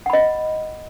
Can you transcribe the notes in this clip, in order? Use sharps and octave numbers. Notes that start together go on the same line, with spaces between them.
D#5 F#5 B5